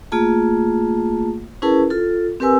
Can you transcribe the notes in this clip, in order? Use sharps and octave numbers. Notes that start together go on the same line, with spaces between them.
A3 A#3 F4 G#4 A5
C#4 E4 G#4 A#4 B4 A5
F4 A4
C4 G4 A#4 B4 G#5 E6